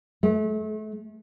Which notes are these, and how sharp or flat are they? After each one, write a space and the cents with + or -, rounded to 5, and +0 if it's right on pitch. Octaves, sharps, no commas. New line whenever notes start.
A3 -35